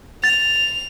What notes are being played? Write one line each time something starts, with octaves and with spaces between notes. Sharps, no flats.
A6 F7